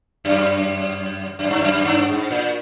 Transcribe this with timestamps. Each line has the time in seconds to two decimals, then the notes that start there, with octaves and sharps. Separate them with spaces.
0.25 F#2
1.39 F#2
1.50 G2
1.61 F#2
1.73 F#2
1.85 G2
2.08 G#2
2.30 A#2